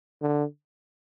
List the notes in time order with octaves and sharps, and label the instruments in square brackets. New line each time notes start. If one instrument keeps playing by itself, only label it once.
[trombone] D3